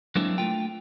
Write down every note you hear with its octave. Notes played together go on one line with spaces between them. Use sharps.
F#3 G#3 A#3 C4 D4 E4
A3 F4 G5